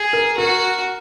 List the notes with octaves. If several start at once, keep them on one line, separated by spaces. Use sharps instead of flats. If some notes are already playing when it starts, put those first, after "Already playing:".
Already playing: G#4
A#4
F#4 A#4